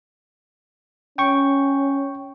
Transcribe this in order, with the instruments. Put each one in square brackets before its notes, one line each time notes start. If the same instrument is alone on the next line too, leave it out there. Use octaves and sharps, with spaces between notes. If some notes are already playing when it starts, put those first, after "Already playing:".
[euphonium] C#4 [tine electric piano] G5 C#6